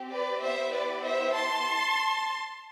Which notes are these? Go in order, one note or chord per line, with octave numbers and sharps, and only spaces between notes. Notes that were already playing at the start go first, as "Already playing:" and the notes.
Already playing: C4 G4
B4 D5
B3 E4 G4 C5 E5
B4 D5
C5 E5
A5 C6